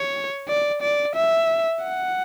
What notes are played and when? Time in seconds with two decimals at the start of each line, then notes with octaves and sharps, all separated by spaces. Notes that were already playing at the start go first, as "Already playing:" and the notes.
Already playing: C#5
0.48 D5
0.82 D5
1.16 E5
1.84 F#5